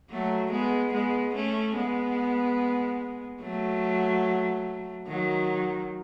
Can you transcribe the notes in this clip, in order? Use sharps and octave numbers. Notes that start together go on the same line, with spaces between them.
F#3 A3
G#3 B3
G#3 B3
A3 C#4
G#3 B3
F#3 A3
D#3 F#3